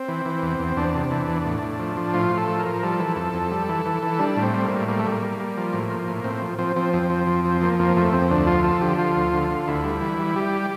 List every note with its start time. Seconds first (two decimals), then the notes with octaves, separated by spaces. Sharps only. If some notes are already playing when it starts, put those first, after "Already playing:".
Already playing: C4
0.09 E3
0.26 E3
0.42 E2
0.60 E2
0.77 E2 D4
0.95 C3
1.11 E3
1.28 E2
1.46 A2
1.63 A2
1.79 F3
1.97 F3
2.14 A2 F4
2.31 A2
2.38 A4
2.48 F3
2.60 A#4
2.66 F3
2.83 G3 A4
2.99 E3
3.16 F2 A4
3.34 F2
3.51 G3
3.69 E3
3.86 E3
4.03 E3
4.19 G3 D4
4.37 A2
4.42 C4
4.54 G3
4.65 A#3
4.71 A2
4.88 G3 A#3
4.99 A3
5.05 G3
5.12 A#3
5.22 G3
5.40 G3
5.57 F3
5.73 A2
5.90 F3
6.08 A2
6.24 A2 C4
6.42 F3
6.59 F3 C4
6.76 F3 C4
6.93 F2 C4
7.10 F3
7.27 F2
7.45 F3
7.61 F3 A#3
7.79 F2 A#3
7.96 F2 A3
8.13 F2 C4
8.31 D2 D4
8.47 F3 F4
8.64 F3 A4
8.81 D3 G4
8.98 F3 F4
9.16 D2
9.33 D3
9.51 D3
9.68 D2 E4
9.84 G3
10.01 E3
10.19 G3
10.36 G3 G4